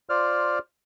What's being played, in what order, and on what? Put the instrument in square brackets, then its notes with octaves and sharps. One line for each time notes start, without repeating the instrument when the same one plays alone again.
[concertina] F4 C5 D5 F6